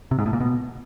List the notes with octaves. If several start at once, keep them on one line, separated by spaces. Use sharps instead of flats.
C3
G#2
A2
A#2
B2